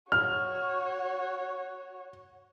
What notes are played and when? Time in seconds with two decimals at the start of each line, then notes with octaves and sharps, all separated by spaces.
0.12 F#4 C#5 F6